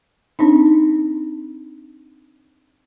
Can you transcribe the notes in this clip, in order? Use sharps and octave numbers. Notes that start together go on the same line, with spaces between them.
C4 D4 D#4